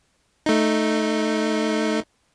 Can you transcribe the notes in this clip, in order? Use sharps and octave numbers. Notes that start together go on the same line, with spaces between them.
A3 D#4